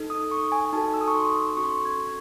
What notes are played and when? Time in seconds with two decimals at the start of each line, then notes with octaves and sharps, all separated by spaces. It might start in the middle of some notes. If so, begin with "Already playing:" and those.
Already playing: D#4 A4
0.10 D#6
0.31 C#6
0.52 G#5
0.65 G#5
0.73 D#4 F#4 A4 A5
0.94 E6
1.01 D#6
1.08 C#6
1.15 C6
1.57 C#4 F#4 A4 C#6
1.64 C6
1.71 C#6
1.85 G#6